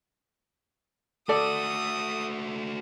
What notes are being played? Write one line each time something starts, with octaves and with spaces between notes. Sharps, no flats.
A3 F#4 A4 D5 D#6